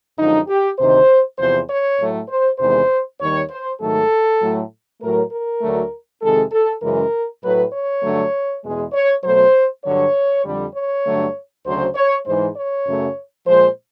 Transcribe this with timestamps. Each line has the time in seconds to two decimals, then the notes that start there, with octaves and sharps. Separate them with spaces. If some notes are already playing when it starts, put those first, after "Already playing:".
0.18 F#2 D3 F3 G#3 D#4
0.48 G4
0.78 D2 C3 D#3 C5
1.38 E2 C3 F3 C5
1.68 C#5
1.98 A2 F#3 A3
2.29 C5
2.59 E2 C3 D#3 G#3 C5
3.20 D#2 D#3 G3 C#5
3.50 C5
3.80 G#2 D#3 F#3 A3 A4
4.40 A2 F#3 A3
5.00 A2 F#3 A3 A#4
5.31 A#4
5.61 D2 D3 F#3 A3
6.21 F2 C3 D#3 G#3 A4
6.51 A4
6.82 F#2 C#3 E3 G#3 A#4
7.42 A2 F#3 A3 B4
7.72 C#5
8.03 G2 D3 F#3 A3
8.64 E2 B2 G#3
8.93 C#5
9.23 B2 F#3 A3 C5
9.84 G2 D3 F#3 C#5
10.44 F2 D3 G3
10.74 C#5
11.05 G2 D3 F#3 A3
11.65 D2 C#3 F#3 C5
11.95 C#5
12.25 G#2 E3 G#3 C5
12.56 C#5
12.86 F#2 C#3 F#3 A3
13.46 A#2 F3 G#3 C5